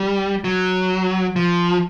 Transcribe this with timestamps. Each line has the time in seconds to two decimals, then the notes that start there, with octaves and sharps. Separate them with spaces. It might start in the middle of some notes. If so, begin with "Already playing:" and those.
Already playing: G3
0.44 F#3
1.36 F3